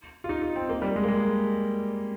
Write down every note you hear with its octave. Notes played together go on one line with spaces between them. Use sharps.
F4
D#4
D#4
C4
A#3
G3
G#3
A#3
G#3